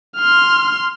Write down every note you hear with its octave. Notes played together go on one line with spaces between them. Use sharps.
C6 F6